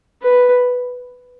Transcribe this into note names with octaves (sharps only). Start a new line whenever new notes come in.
B4